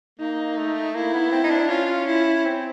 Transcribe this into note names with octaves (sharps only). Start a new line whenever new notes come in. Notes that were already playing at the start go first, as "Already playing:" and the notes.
A#3 D#4
A3
A#3 E4
B3
C4
D#4
D4
C#4 F4
E4
C4